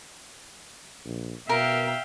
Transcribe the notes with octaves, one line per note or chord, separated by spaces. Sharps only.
A#1
B2 A#4 E5 F5 G5